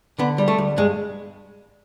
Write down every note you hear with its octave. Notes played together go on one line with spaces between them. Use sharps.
D3 B3
G3
A3
D2
G2 G#3